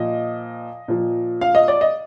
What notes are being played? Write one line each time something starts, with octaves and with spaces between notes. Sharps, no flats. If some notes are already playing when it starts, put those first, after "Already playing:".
Already playing: A#2 F3 D#5
A#2 F3
F5
D#5
D5
D#5